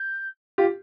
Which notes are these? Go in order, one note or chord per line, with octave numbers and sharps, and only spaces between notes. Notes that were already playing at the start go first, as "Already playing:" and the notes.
Already playing: G6
F4 G4